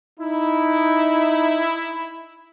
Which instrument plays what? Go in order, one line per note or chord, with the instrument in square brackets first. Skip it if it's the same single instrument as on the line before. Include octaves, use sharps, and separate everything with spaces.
[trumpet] D#4 [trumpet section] E4